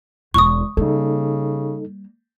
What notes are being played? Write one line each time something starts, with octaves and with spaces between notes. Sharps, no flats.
E1 E2 C#6 D#6
C#3 G3 A#3 D#4 A4